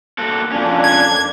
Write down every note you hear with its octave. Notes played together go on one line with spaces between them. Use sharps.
A#3 F#4 A4
F2 F3 A#3 C#4 D4
G#6